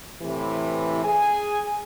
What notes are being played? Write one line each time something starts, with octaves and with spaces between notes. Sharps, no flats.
A2 C3 E3
G#4 G#5